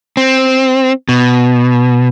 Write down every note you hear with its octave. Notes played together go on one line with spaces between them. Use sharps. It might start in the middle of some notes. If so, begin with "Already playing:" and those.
C4
B2